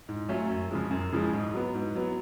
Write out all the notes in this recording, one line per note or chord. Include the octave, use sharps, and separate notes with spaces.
G#2
F#3 A3 C#4 F4
F#2
C#3 F3 G#3
F#2
C#3 F3 G#3
G#2
F#3 B3
G#2
F#3 B3